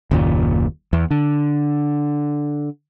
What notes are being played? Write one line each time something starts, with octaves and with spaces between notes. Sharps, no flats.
F#1 D#2 A#2
E2
D3